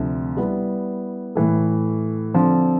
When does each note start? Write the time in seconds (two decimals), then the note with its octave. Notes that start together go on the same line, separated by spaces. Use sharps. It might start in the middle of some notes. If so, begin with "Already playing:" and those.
Already playing: D2 C3 F3
0.37 G3 B3 E4
1.35 A2 E3 A3
2.34 D3 F3 C4